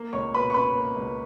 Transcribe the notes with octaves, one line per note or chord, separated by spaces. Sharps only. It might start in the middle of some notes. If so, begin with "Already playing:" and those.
Already playing: A#3
C#2 C#5 C#6
B2 B4 B5
C#6
C#4 B4 B5
A#3
C#2